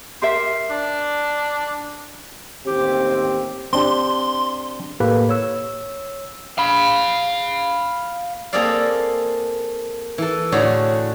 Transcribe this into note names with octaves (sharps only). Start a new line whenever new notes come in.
G4 A#4 E5 C6
D4
A1 D#2 C4 G4
C4 D4 G4 C6
A2 A#3 G4 A4 B4
C#5 E6
F5 B5
A#3 C4 G#4 A4 D5 F5
E3 A4
A2 D3 F#4 G#4 C#5